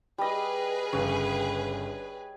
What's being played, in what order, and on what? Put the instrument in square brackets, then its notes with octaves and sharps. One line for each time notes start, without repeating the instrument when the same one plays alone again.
[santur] G3 D#5 [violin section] G#4 B4
[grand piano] G1 C#3 [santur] C#5